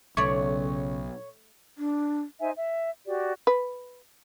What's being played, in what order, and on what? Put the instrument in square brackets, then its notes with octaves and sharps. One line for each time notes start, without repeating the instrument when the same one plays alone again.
[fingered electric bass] B1 [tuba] C#3 [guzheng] A3 D5 [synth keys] C#5
[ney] D4
[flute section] D#4 C5 E5 G#5
E5
F#4 G4 D5
[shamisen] B4